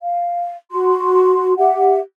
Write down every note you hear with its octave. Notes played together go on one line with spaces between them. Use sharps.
F5
F#4 C6
G4 E5 F#5